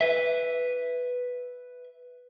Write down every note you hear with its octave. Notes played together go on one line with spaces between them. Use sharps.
B4 E5